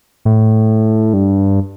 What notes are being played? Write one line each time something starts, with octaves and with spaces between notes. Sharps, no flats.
A2
G2